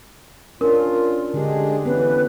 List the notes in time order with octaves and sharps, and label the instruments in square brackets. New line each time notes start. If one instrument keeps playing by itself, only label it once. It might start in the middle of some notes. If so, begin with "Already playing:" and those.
[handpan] C#4 D4 [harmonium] F4 [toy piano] A#4
[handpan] D3 G4 [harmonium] G#3 D4 G#4
[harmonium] E3 [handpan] B3 C#4 [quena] B4